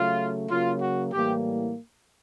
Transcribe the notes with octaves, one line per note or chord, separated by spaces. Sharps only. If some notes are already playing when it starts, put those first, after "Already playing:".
Already playing: C#3 F#3 A3 F4
C#3 F#3 A#3 F4
F#4
A2 E3 G3 A#3 G4